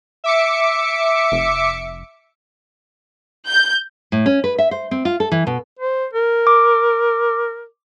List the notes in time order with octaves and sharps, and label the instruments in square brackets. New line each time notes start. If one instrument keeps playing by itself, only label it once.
[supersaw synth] E5 D6 C#7
[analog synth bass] F1
[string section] G6
[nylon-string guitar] A2
C#4
B4
E5
C5
C4
F4
A4
E3
B2
[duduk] C5
A#4
[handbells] D6